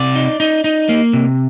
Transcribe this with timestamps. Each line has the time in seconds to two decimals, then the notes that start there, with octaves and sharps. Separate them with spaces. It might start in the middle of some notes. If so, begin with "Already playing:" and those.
Already playing: C3 D5
0.15 D#4
0.40 D#4
0.64 D#4
0.89 A#3
1.13 C3